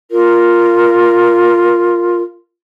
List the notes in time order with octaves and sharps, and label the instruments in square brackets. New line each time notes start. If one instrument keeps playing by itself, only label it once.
[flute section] F4 A#4